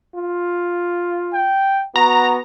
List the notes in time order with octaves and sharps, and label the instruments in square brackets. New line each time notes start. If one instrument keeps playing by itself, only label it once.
[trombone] F4
[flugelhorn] G5
[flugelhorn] B3 [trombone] F#4 [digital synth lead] A#5